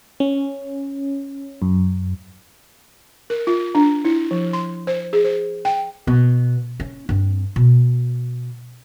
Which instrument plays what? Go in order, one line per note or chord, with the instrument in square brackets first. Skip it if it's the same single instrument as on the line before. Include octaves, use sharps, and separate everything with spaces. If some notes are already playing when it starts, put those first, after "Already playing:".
[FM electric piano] C#4
F#2
[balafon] A#4
F4
D4
E4
F3
C6
C5
G#4
C5
G5
[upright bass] B2
C#4
G2 C4
B2